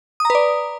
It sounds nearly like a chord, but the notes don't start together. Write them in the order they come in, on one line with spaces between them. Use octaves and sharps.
D#6 A#5 B4 D5